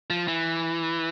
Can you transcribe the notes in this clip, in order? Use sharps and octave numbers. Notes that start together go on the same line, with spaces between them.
F3
E3